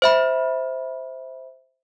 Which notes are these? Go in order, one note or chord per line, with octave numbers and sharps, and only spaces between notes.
C5 E5 B5